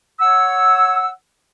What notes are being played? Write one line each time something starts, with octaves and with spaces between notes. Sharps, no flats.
C#5 F#5 E6